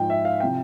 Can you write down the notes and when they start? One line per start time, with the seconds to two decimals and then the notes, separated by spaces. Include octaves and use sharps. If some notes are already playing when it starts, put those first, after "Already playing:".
Already playing: G#2 F3 G5
0.10 E5
0.25 F5
0.40 C3 F3 G5